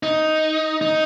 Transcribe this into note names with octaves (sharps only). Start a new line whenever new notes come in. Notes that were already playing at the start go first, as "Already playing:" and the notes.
D#4
D#4